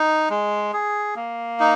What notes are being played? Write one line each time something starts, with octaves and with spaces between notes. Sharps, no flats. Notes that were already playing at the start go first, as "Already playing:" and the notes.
Already playing: D#4
G#3
G#4
A#3
D#4